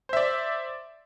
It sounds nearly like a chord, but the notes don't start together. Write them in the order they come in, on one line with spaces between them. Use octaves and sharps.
C5 E5 D5